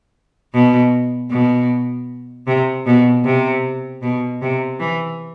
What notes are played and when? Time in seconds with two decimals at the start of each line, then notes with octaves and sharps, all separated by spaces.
0.54 B2
1.31 B2
2.47 C3
2.86 B2
3.25 C3
4.02 B2
4.42 C3
4.79 E3